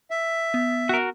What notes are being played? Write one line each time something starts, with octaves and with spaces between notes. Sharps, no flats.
E5
B3 B6
F#4 A#4